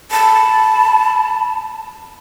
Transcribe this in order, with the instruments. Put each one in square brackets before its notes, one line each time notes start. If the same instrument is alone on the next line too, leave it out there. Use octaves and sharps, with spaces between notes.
[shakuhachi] A5 [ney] B5